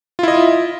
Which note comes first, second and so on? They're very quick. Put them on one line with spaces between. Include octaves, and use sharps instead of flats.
F4 E4 D#5